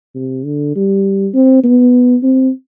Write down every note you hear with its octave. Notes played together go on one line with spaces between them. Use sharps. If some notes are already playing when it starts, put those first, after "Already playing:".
C3
D3
G3
C4
B3
C4